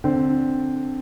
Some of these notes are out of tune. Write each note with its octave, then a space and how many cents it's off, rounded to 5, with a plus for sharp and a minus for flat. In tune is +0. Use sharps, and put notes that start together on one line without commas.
D3 +0 C4 +0